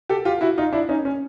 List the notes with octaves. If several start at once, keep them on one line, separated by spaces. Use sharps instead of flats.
G4 A4
F4 G4
E4 F#4
D#4 F4
D4 E4
C#4 D#4
C#4